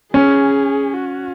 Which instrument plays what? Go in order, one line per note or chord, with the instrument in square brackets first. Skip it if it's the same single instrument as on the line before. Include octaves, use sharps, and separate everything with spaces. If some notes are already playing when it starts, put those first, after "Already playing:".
[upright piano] C#4 [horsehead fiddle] G#4
[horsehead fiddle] F#4